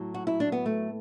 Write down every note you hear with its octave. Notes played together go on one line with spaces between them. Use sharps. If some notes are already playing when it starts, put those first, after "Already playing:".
Already playing: A2 F#3
F#4
E4
D4
B3
A3